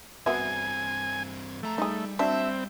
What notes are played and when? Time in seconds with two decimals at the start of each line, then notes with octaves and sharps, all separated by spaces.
0.26 G2 B3 C4 F#4 E5 G#5
1.63 F2 A3 A#5
1.78 G3 D#4 G#4
2.19 F#3 C4 D4 E5